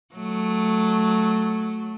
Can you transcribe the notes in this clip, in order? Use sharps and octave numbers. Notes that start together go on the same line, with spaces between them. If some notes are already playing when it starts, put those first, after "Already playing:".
F#3 A3